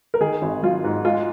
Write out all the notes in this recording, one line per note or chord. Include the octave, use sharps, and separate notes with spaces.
A#4
D#3 G#4
G#1
F#3 F4
G#2
G#3 F4